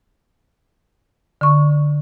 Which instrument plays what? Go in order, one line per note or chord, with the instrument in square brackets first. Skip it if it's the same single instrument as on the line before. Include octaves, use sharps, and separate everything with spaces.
[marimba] D3 C#6